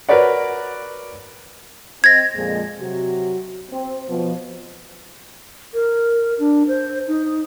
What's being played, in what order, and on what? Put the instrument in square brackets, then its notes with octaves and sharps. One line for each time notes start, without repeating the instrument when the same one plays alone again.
[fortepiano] F#4 A#4 B4 C#5 D5 F#5
[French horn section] C4 D#5 [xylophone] G#6 A#6
[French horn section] F2 A#2 G#3
C3 F#3 F#4
C4
B2 F3
[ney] A#4
D4
C5
D#4